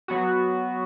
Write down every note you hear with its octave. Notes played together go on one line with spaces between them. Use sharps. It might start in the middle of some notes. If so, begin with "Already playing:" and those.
F#3 B3 F#4